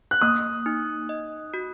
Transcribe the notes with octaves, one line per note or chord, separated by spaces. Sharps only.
F#6
A#3 D#6
D#4
D#5
F#4